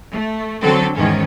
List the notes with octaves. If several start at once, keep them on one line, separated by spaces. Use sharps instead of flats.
A3
D3 F#3 C4 A4
E2 G#2 D#3 C#4